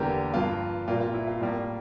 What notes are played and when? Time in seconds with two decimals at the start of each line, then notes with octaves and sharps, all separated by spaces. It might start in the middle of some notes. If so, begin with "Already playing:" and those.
Already playing: E2 D3 G3 A#3 G4 A#4
0.34 G2 F3 A#3 F4
0.87 A#2 G3 A#3 F4
1.01 F4
1.14 E4
1.27 F4
1.41 A2 G3 A#3